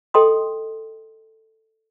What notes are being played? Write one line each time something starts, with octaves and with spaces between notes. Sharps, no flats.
A4 D#5 G5 C6 D#6